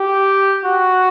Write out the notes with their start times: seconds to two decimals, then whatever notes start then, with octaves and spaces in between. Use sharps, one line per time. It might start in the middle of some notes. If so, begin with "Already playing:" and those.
Already playing: G4
0.64 F#4